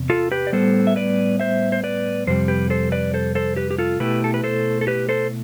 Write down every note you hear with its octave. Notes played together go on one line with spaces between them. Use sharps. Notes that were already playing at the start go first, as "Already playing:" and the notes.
Already playing: E2 C3
F4 A4
G4 B4
D5
A2 G3 B3 A4 C5
E5
B4 D5
C5 E5
C5
B4 D5
F2 C3 G3 C5
G4 B4
A4 C5
B4 D5
A4 C5
A4 C5
G4 B4
G4
F4 A4
B2 A3 E4 G4 B4
A4
B4
A4 C5
A4
G4 B4
A4 C5